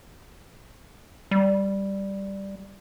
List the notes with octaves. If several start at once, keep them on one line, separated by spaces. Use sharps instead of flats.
G3